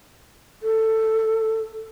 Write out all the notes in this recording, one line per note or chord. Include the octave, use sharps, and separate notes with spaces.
A4